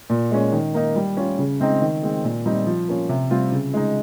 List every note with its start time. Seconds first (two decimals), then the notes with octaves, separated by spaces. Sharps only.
0.10 A#2
0.31 G#3 C#4
0.52 D#3
0.74 A#3 D#4
0.96 G3
1.17 C#4 F4
1.39 C#3
1.60 G#3 C4 D#4
1.81 D#3
2.02 G#3 C4
2.24 A#2
2.46 G3 C4 D#4
2.66 F3
2.88 A#3 C#4 F4
3.09 C3
3.30 G3 C4 F4
3.52 C#3
3.74 G#3 D#4